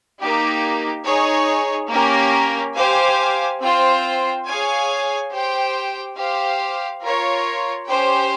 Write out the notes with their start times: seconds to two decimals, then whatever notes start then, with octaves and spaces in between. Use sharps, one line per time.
0.20 A#3 D#4 G4
1.05 D#4 G#4 C#5
1.90 A#3 C#4 G4 A#4
2.75 G4 C5 F5 G#5
3.61 C4 F4 C5 G5
4.46 G#4 C#5 F5 G#5
5.31 G4 C5 G5
6.17 G4 C5 F5
7.02 F4 A#4 C#5
7.87 C#4 G4 C5 G5